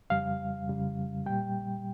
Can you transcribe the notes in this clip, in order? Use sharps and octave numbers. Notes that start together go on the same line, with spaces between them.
F2 C#3 G3 F5
F2 C#3 G3
A#2 G3 G5